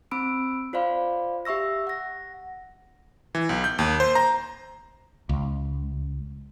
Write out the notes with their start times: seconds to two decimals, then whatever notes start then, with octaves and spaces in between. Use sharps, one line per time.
0.11 C4 B5 E6 D7
0.73 F4 C5 D5 F5 B5
1.45 G4 E5 C#6 E6 A#6
1.87 F#5 A#6
3.35 E3
3.49 B1
3.64 G6
3.79 D#2
4.00 C5
4.15 A#5
5.29 C#2